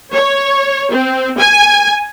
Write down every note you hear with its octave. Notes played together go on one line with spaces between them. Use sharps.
C#5
C4
G#5